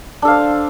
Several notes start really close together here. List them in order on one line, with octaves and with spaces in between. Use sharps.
D4 A4 F5 C5